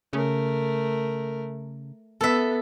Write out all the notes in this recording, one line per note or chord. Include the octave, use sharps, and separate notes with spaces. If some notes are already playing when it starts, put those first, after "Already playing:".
C#3 A3 A#4
B3 A4 E5